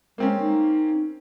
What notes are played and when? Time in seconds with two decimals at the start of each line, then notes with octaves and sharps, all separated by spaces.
0.18 G#3 A#3 C4 C#4
0.40 D#4